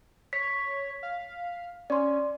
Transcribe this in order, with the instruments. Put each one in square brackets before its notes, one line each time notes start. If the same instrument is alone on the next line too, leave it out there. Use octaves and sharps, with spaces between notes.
[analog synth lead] C#5 [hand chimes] B6
[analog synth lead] F5
[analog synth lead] C#4 [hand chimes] D5 C6